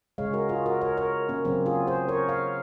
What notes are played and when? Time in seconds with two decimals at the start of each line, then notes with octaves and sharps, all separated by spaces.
0.18 C#3 G#3 C#5 F5
0.33 F#4 A#4
0.49 F4 G#4
0.66 F#4 A#4
0.81 A#4 C#5
0.97 A#4 C#5
1.29 A#3 C#4
1.45 C#3 F#3 A#3 C4
1.66 F4 G#4
1.87 G#4 C5
2.08 A#4 C#5
2.29 C#5 F5